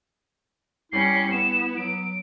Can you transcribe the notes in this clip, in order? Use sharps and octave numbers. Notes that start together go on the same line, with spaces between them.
G3 C#4 E4 C7
B3 E7
F#3 D7